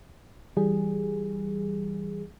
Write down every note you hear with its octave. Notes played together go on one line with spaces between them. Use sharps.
E3 G3 G#4